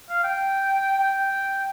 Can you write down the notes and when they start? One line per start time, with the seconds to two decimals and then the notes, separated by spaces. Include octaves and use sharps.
0.09 F5
0.24 G5
0.99 G5